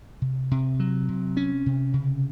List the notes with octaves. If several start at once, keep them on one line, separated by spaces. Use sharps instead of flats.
C3
C3
F#3
C3
C#4
C3
C#3